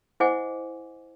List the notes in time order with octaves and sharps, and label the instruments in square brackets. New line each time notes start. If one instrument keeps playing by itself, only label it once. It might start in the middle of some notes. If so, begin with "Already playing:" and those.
[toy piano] E4 C5 D#5 F#5 G#5 D6